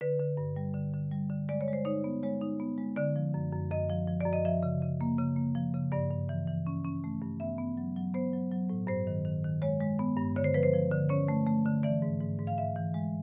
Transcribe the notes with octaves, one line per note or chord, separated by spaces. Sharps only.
D3 B4
D3
G2
G3
D3
D3
G3
D3
G#3 D5
C#5
G#3
C5
D#4 C#5
B3
G#3 C#5
D#4
B3
G#3
D3 D5
F3
F#2
F#2
F#2 D#5
F3
F3
F#2 D5
D#5
F3 E5
C#3
C#3
A#3
C#3
A#3
F3
C#3
G2 D5
G2
E3
E3
C#4
C#4
A3
G2
B3 E5
B3
F#3
F#3
B3 C5
F#3
F#3
A2
G2 C5
D#3
D#3
D#3
G#3 C#5
G#3
B3
G2
D3 C#5
C5
F3 B4
C5
F3
D3
C#4 C#5
A3
A3
D3
E3 D5
G#2
G#2
G#2
F5
G#2 E5
E3
G#3